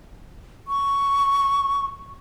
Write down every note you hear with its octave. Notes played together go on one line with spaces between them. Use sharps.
C#6